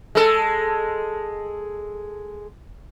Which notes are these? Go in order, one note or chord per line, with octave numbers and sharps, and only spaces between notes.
G#3 A4